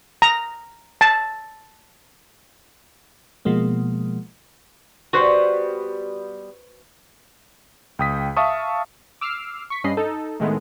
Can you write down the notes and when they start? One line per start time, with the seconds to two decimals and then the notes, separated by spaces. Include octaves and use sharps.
0.22 A#5
1.01 A5
3.45 B2 F3 G#3 A#3
5.13 G3 B3 F#4 B4 C5
7.99 C#2 G5 D#6 B6
8.37 E5 F5 A5 C#6 D#6
9.21 D6 E6 F6 C7
9.70 C#6 B6
9.84 G2 C#4 D#5 B5 C7
9.97 D#4 A4
10.40 A2 D#3 G#3 A3 B3